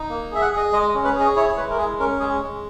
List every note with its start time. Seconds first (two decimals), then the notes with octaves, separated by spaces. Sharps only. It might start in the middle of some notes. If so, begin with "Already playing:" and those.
Already playing: D#4
0.10 A#3
0.31 G#4 E5
0.42 F#5
0.52 G#4 D#5
0.73 G#3 D#5
0.89 D#5
0.95 C#4
1.04 B4
1.15 G#4
1.20 D#5
1.36 E4 C#5
1.49 C#5
1.57 G#3 B4
1.70 A#4
1.78 G#4
1.99 C#4 A#4
2.20 G#3 G#4
2.41 G#3